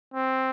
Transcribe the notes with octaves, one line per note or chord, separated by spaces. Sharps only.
C4